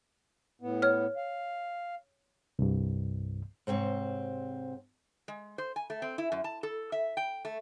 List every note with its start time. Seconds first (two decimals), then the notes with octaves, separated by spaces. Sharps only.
0.62 A2 B3
0.82 C#5 F6
1.16 F5
2.59 C2 G2
3.67 G#2 C3 C4 C#5
5.28 G#3
5.58 C5
5.76 G#5
5.90 A3
6.02 C4
6.18 E4
6.32 F#2
6.44 A5
6.63 A4
6.92 E5
7.17 G5
7.45 A3